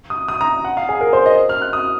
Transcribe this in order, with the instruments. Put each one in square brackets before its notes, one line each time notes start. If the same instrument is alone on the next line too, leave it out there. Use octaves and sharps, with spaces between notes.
[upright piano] D#6
D#6
A#5
F#5
F5
G#4
A#4
C5
D#5
F6
F#6
D#6